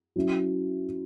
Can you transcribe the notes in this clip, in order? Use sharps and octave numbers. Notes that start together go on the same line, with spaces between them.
F#3 C#4 E4